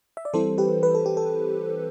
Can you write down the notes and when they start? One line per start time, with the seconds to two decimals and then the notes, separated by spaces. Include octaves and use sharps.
0.17 E5
0.25 D5
0.33 E3 G3 C4 E4 A4 C5
0.58 G4 B4
0.83 B4
0.95 A4
1.06 G4
1.17 A4